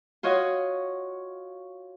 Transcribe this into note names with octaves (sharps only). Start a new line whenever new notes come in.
F4 F#4 C#5 D#5